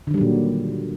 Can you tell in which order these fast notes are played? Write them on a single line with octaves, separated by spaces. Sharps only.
D3 D#3 G3 F#3 A#2